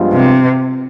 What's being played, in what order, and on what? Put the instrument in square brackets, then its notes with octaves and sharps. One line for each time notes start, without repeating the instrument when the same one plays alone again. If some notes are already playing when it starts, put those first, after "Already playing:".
Already playing: [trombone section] G2 F3 G#3 B3 F4
[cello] C3